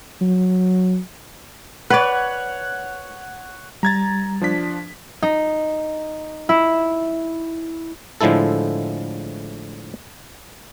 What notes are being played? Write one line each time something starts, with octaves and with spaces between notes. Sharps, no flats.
F#3
B4 C#5 D5 F#5
G3 A#5 G#6 A6
F3 D4 B6
D#4
E4
A2 D3 F3 G#3 E4 A4